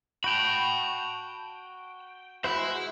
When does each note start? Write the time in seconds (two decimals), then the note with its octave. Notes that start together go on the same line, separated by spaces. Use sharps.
0.24 F#4 G5 A5 B5
2.44 G#3 F#4 C5 E5 B5